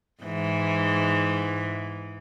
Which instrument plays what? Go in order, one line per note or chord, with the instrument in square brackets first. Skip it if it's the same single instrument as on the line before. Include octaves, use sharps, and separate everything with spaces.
[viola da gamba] G#2 E3